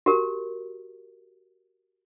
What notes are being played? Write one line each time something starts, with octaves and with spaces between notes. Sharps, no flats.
F#4 G4 A#4